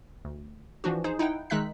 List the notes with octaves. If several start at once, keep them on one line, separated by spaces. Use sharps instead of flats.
D2
E3 F3 D4 F#4
D#4 G#4 C5
D#4 E4 F#5 G5
D#3 G#3 D#4 E5 F#6 B6